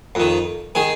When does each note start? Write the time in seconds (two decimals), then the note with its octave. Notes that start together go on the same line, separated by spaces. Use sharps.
0.15 F2 D#3
0.75 D#3 G#4